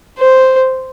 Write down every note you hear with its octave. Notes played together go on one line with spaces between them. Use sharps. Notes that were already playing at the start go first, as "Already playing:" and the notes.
C5